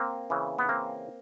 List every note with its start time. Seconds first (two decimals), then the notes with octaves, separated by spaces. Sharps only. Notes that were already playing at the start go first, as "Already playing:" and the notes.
Already playing: A#3 C4
0.30 C#3 E3
0.59 B3
0.69 A#3 C4